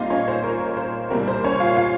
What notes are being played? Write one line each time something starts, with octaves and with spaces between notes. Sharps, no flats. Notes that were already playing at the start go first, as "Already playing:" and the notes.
Already playing: A#2 G3 C4 D#4 F4 D#5 F5
C#4 C#5
C5
A#4
A#4
C5
C2 A#2 G3 C4 A#4
C5
C#4 C#5
F4 F5
F4 F5